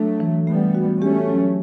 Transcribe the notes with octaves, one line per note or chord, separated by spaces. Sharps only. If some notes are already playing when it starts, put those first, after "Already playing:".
Already playing: F#3 A3 D4
E3
G3 A3 B3
F#4
A3 C#4 G4
F#3